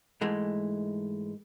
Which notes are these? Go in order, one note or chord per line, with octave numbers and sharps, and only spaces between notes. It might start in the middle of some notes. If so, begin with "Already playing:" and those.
G#2 E3 G#3 A3